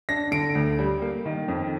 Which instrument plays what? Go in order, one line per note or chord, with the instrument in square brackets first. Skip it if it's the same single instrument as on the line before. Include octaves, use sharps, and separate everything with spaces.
[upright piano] D4 A#6
D3 D7
D2
G3
A#3
D#3
F2